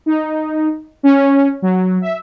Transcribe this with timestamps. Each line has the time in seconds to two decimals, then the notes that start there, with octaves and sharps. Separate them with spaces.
0.06 D#4
1.03 C#4
1.62 F#3
2.02 E5